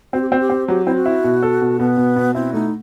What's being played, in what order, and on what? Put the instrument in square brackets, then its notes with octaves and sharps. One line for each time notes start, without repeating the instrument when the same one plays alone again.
[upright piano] C4 [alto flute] F#4
[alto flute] G4
[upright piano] C4 [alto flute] F#4
[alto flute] G4
[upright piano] C4
[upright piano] F#3 [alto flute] G4
[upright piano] C4 [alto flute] E4
[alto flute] F#4
[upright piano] E4
B2
A4
B2
[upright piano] B2 [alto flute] B3
[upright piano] B2
B2
[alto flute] C4 [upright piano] E4
[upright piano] A3 [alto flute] D#4